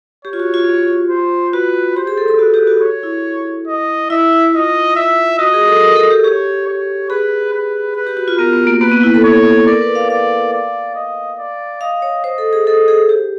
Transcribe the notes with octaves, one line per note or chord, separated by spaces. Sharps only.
G4 C#5
F4
F#4
F4
C5
F#4 B4
G4 C5
G#4
A4
A4
F#4 B4
G4
F#4
C#5
E4
D#5
E4 E5
E4
F4 D#5
E5
F#4 D#5
G#4
A4
A#4
A4
G4
G4 C#5
C#5
G#4 B4
B4
B4
G4
F#4
F4
B3 A#4
B3
A#3
A#3 B4
B3
E4
A4
C#5
A#4 D5
B4
F5
D5 F5
D5
D#5
D5
D#5 F5
C#5
C5 D#5
A4
G#4
A4 D#5
G#4
G4